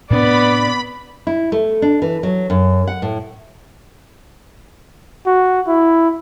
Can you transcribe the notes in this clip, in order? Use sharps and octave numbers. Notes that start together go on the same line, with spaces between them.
A2 C3 B3 D4 D5 B5
E4
A3
D4
E3
F#3
F#2
F#5
A2
F#4
E4